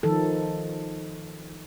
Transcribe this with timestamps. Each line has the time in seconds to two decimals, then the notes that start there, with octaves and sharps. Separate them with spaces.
0.03 D#3 F3 A4